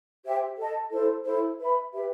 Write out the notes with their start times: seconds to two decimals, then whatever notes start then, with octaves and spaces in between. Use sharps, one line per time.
0.24 G4 C5 E5 G5
0.58 A4 D#5 A5
0.91 E4 A4 C5
1.25 E4 A4 C5
1.59 B4 E5 B5
1.93 G4 B4 E5